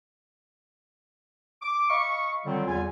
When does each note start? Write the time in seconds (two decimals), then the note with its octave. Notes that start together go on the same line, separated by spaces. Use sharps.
1.62 D6
1.90 D#5 F5 B5 C#6
2.45 D3 D#3 F#3 G3 C4 F4
2.67 E2 D3 G3 F4 G#5